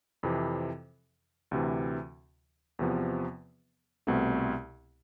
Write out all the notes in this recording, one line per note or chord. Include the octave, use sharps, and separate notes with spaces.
F2 C3 E3
D2 C3 E3
E2 C3 F3 B3
C2 B2 A3 C4